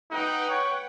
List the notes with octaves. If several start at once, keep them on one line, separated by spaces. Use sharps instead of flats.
D#4 B4 F#5 G5
C#5